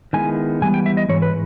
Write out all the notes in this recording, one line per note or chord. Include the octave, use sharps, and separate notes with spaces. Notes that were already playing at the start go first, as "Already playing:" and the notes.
D#3 G#3 B3 E4 G#5
G#2 E3 G3 B3 G#5
G5
E5
D#5
G#2 E3 C#5
B4